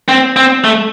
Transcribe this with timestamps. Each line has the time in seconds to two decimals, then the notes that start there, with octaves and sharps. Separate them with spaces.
0.08 C4
0.36 C4
0.64 A3